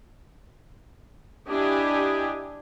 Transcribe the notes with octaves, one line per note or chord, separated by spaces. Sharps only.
D4 E4 G4 D#5 G#5